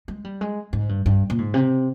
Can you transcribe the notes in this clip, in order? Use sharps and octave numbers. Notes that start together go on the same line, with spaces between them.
G#3
G3
G#3
G#2
G2
G2
A#2
G#2
C3